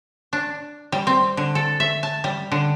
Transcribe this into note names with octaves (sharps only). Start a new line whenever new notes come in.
D4
G3
C4
D3
A4
E5
A5
G3
D3